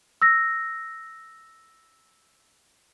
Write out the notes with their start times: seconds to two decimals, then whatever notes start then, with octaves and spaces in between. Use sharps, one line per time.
0.22 E6 A#6